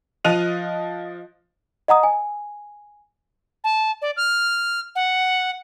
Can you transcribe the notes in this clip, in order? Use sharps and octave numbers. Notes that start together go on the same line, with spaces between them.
F3 F4 D#5 F#6 D#7 F7
D#5 F#5 A#5 D#6
G#5
A5
D5
F6
F#5